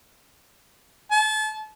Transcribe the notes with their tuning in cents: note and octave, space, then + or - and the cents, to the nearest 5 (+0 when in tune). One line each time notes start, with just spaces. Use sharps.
A5 -35